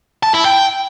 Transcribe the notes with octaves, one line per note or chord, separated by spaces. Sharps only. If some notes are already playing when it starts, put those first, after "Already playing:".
A5
E4
G5